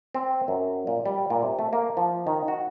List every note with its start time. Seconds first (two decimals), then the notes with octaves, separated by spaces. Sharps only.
0.15 C4
0.48 F#2
0.87 A#2
1.06 G3
1.30 A#2
1.43 C3
1.59 A3
1.73 A#3
1.97 F3
2.27 D#3
2.48 F#4